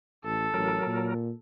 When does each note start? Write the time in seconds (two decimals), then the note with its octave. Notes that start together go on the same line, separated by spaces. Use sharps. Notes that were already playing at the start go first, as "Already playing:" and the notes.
0.25 A1 A4
0.54 A1 F#3 A#4
0.87 A#2